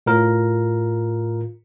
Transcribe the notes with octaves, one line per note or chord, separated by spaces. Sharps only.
A2 F4 A#4